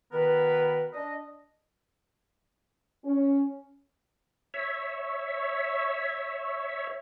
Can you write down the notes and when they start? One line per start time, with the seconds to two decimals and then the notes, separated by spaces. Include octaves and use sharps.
0.12 B2 D#3 B3 A#4 B4
0.93 D4 D#5
3.05 C#4
4.54 C#5 E5